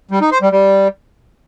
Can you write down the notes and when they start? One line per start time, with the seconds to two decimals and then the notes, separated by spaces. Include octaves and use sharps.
0.11 G3
0.21 D#4
0.32 C5
0.42 G3
0.52 G3